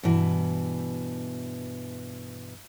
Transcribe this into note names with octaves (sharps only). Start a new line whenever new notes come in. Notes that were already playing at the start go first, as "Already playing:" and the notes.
G2 B2 E3